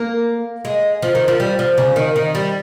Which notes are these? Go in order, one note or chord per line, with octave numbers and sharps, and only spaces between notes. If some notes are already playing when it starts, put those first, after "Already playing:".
Already playing: A#3
G#3
F3
D#3
F3
G3
F3
C#3
D#3
D#3
G3